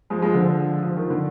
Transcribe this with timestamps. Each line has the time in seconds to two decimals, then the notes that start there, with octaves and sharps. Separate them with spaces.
0.10 F3 G#3
0.22 F3 G#3
0.34 D3 F3
0.83 F3
0.96 D#3
1.10 D3